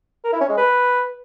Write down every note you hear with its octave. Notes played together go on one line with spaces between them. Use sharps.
A#4
E4
C#4
G#3
B4